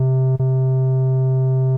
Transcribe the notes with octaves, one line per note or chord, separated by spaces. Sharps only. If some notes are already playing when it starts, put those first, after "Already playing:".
Already playing: C3
C3